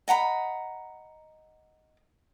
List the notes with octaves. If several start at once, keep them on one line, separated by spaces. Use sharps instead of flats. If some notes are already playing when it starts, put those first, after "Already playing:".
D#5 F#5 A#5 B5